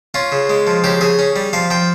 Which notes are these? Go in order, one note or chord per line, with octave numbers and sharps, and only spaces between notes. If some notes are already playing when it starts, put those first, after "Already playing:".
C#4 F4
C#3
G#3
F3
C#3 G4
C#3 G#4
C#4
G3
F3 F5
F3 G5